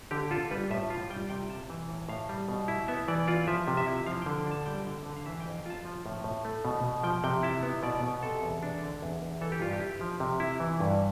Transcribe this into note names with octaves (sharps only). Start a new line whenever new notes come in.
D3 G4
F4 A4
G3 B4
A2 E5
F4 F5
G3 G5
C3 G5
F4 A5
E3
A2
A2 F5
G3
B2
E4
B3 E5
E3 D5
F4 D5
F3 E5
C3
E5
E4
F3 F5
G5
D3
D4 A5
G3 G5
D3
D3
F5
E3 E5
G5
F2
F5
F4 A5
F3
A2
A2
A3
B2
B2
F3 G5
C3 G5
E4 A5
B3
B2 D5
B2
C3 A4
E2
D4
D3
E2
E2
E3 A4
G4
G2 F4
G4
E4
F3
C3
E4
E3
G2